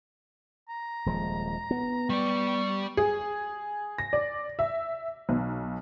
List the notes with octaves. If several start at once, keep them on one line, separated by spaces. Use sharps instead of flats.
A#5
D#1 F3 G#3
B3
G3 D5 C#6
G#4
A#6
D5
E5
B1